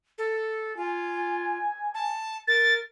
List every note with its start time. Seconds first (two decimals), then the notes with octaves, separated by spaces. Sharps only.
0.18 A4
0.77 F4 G#5
1.94 A5
2.48 A#4 A6